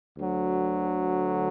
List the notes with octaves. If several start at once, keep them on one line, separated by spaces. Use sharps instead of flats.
D2 D3 F#3